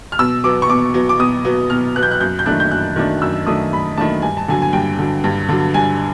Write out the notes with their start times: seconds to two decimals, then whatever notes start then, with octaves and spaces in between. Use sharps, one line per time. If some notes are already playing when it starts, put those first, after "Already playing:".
0.12 F6
0.19 B2 E6
0.44 F#3 B3 D6
0.62 C#6
0.69 B2 D6
0.94 F#3 B3
1.09 D6
1.19 B2 D#6
1.45 F#3 B3
1.70 B2 F6
1.96 F#3 B3 F#6
2.03 G6
2.11 F#6
2.21 F#2 G6
2.39 G6
2.46 D#3 F#3 A3 D4 F#6
2.60 G6
2.71 F#2 F#6
2.96 D#3 F#3 A3 D4
3.22 F#2 E6
3.47 D#3 F#3 A3 D4 D#6
3.72 F#2 B5
3.98 D#3 F#3 A3 D4 A5
4.22 G2 G#5
4.37 A5
4.48 D3 F#3 G#5
4.62 G#5
4.73 G2 G5
4.99 D3 F#3
5.24 G2
5.49 D3 F#3
5.74 G2 G#5